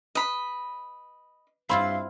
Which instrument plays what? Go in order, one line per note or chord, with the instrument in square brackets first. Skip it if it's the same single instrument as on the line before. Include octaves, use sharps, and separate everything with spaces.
[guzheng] B4 [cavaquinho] D#5 B5
[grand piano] G2 B5 C6 [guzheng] C4 E4 F4 [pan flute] F5